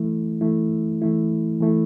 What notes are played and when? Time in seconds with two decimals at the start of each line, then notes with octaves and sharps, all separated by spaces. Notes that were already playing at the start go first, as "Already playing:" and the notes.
Already playing: E3 A3 E4
0.41 E3 A3 E4
1.02 E3 A3 E4
1.61 E3 A3 E4